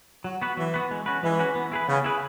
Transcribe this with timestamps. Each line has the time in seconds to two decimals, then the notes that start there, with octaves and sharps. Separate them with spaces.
0.24 F#3 F#4
0.42 B3 F#4 B4
0.57 E3 F#3
0.74 B3 F#4 B4
0.91 G#3
1.06 C#4 F#4 B4
1.23 E3 G#3
1.39 C#4 F#4 B4
1.55 B3
1.72 E4 G#4 B4
1.88 C#3 B3
2.04 E4 G#4 B4